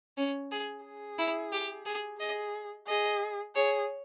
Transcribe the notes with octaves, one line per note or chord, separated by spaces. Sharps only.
C#4
G#4
G#4
E4
G4
G#4
G#4 D#5
G#4 D#5
G#4 C#5